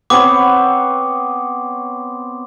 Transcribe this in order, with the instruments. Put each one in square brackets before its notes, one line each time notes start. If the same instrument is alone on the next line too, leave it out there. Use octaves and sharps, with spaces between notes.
[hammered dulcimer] B3 C4 C#5 [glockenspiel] D6